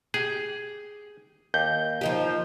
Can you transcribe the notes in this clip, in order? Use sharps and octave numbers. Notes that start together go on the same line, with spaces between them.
G4 G#4
D#2 G6
F3 D#4 G4